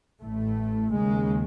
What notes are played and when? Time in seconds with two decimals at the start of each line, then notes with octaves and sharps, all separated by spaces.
0.21 A1 A2 A3
0.93 D#2 C#3 G#3